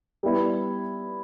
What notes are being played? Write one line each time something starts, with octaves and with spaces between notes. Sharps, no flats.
G3 B3 E4